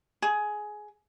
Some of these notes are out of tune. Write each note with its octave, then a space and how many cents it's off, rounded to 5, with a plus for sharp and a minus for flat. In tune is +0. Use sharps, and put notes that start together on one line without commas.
G#4 +15